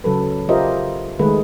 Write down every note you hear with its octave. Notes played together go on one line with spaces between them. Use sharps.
C#3 F#3 A4 B4
F4 G4 A#4 C5 D#5 E5
D#3 G#3 A3 G#4 B4